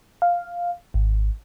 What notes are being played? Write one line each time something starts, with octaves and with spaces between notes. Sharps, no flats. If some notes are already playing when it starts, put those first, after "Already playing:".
F5
G#1